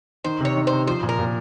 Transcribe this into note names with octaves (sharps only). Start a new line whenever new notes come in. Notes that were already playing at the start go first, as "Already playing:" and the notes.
D#3 C5
C3 C#5
D#3
C3 C5
F3 C5
A#2
A#4
A#2